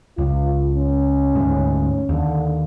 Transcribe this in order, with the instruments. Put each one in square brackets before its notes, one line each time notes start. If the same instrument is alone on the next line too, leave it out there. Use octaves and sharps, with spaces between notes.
[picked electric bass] C#2 [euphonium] F4
[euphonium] C#4
[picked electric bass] D2 G#2
[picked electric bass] D#2 [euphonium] D3